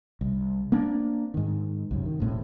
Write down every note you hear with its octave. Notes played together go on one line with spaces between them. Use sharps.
C2
A#3 C4 D4
G#2 D#3
C2 F#2
D#3
E1 A2 A#3 C4